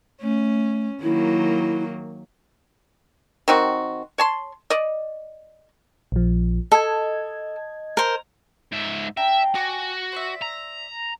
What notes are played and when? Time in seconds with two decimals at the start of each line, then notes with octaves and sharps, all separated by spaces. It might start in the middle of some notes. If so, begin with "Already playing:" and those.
0.22 A3 C#4
1.02 D#3 F#3 A#3 E4
3.48 D#3 C4 F#4
4.18 C#5 A5 C6
4.70 D5 D#5
6.12 A#1 F3
6.72 A4 D#5 G#6
7.97 A#4 C5
8.72 G#2 E5
9.17 D4 E5 G5 A#5
9.55 F#4 G#5 D6
10.12 C5 D5 E5
10.42 A#5